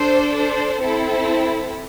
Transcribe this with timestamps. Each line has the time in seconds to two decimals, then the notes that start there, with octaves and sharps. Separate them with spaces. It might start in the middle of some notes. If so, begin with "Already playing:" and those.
Already playing: D4 A4 C5
0.36 C5
0.81 C4 E4 A4